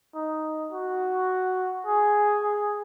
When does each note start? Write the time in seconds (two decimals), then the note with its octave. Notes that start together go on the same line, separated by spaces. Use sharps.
0.15 D#4
0.72 F#4
1.86 G#4
2.43 G#4